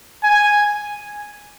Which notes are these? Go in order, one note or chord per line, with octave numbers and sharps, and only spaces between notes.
G#5